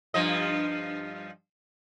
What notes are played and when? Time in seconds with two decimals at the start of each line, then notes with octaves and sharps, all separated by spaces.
0.14 G2 F3 D#5